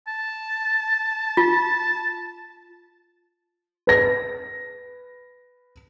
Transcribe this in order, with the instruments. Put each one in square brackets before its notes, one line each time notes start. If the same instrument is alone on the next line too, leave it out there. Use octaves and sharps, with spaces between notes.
[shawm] A5
[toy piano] F4
[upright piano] B4 A#6